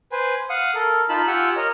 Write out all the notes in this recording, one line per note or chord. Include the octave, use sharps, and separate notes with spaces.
B4 C5 G#5
F5 F#5 D#6
A4 A#4
D#4 F4 A5 B5
F4 G4 F#5 G#5 E6
A#4 C#5 D#5